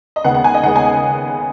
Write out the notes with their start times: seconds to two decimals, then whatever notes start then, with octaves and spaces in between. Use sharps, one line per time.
0.16 D#5
0.24 D#2 C#3 G#3 B3 F#5
0.34 F#5
0.44 G#5
0.54 D#5
0.64 D#2 C#3 G#3 B3 F#5
0.76 G#5